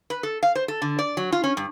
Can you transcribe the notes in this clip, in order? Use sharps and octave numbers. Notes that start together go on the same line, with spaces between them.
B4
A4
F5
C5
A4
D3
D5
F#3
F4
C#4
G2